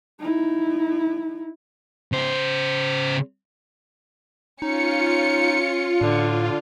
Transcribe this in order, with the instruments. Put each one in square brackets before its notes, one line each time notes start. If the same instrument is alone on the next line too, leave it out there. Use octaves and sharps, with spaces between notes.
[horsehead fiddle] D#4 E4
[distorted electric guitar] C#3 C5
[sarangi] C#4 [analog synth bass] D#4 [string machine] F4 [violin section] C#7
[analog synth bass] A2 [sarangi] D3